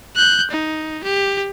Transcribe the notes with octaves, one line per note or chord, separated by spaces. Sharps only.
F#6 G6
D#4
G4